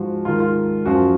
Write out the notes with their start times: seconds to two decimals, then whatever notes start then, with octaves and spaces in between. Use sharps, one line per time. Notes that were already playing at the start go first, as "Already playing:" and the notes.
Already playing: G#2 F3 F#4
0.25 G#2 D#3 F4
0.40 F4
0.86 F#2 F3 F#4